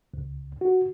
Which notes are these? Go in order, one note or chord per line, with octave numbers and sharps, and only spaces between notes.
C#2
F#4